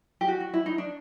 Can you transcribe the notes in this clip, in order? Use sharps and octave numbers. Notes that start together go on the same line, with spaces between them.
G4
F#4
F#4
E4
D#4
D4